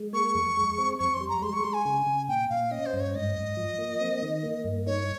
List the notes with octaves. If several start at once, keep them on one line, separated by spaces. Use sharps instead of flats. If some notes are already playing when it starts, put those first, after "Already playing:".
Already playing: G#3
A#3 C#6
F2
G#3
C4
F2 C#6
C6
G3
A#5
G#3 C6
C#6
G#3 C6
G#5
C#3
C#3
A#2 G5
A#2 F5
C#4 D#5
C5
G2
C#5
G#2 D#5
G#2
F3
A#3
C4
D#3
A#3
G2
D#4 C#5